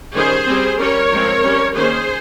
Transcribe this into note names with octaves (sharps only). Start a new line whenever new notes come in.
D#3 G3 C#4 G#4 C5
G3 C4
G3 C#4 A#4 C#5
F3 G#3 C4
G3 C#4
D#3 A#3 C#4 G#4 C5